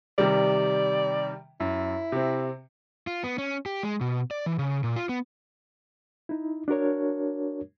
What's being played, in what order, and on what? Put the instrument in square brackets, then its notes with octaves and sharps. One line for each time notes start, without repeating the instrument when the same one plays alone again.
[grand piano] C3 D#3 G3 [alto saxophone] D5
[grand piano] F#2 [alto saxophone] E4
[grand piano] C3 C4
[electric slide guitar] F4
B3
C#4
G4
G#3
B2
D5
E3
C#3
A#2
F4
B3
[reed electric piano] D#4 E4
D4 F#4 A#4 C#5